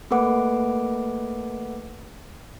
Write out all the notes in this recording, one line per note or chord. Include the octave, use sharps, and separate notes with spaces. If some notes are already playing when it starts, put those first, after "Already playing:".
A3 A#3 A4 B4 F#5 D6